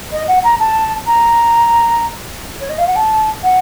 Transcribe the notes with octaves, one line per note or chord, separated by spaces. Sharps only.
D#5
F#5
A#5
A5
A#5
C#5
D#5
F5
F#5
A5
F#5